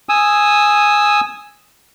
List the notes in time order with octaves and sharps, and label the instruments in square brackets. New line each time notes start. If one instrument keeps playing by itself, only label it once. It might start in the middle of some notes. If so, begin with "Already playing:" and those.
[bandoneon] G#5 D#6 E6